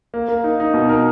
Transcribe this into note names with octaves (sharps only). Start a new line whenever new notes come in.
A#3
A#3
D#4
D#4
B2
A#4